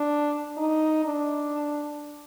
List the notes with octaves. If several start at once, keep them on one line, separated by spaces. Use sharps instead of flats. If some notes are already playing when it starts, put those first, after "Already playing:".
Already playing: D4
D#4
D4